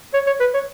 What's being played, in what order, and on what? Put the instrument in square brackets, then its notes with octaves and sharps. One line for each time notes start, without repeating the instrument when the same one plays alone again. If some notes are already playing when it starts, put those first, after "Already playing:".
[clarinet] C#5
C#5
B4
C#5